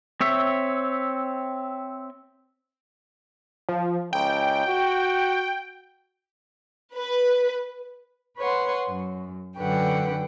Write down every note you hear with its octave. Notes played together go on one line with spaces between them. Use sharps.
C4 C#5 E5
F3
C#2 G5
F#4
B4
B4 C#5 F#5 C6
F#2
F#2 D3 B4 F#5 G5